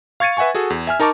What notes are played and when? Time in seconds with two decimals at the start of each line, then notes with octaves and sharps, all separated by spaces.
0.20 F5 C#6 G#6 A6 C#7 D#7
0.37 B4 E5 F#5 G#5 C#6
0.55 F#4 G#4 A4
0.70 E2
0.87 E5 G#5 F6
1.00 D#4 A#4 A5 C#6 D6